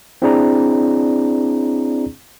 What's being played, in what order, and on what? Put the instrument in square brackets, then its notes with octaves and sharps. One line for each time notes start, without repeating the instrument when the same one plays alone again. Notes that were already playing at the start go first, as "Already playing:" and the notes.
[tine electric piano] C4 D4 E4 G#4 D5 A#5